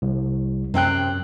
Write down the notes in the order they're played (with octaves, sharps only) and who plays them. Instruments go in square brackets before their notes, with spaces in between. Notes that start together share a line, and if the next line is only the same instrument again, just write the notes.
[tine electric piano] C2
[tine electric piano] F#2 F#6 [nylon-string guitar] C3 C4 G5